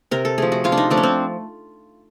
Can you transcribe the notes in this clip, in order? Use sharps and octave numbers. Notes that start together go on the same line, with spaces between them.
C3 A#4
A4
F3 A3 G#4
F#4
C3 F4
D4
D#4
F3 A3 D4
C#4
C4